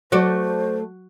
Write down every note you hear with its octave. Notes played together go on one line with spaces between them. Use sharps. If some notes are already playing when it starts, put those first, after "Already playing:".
F#3 A3 F#4 A4 C5 D5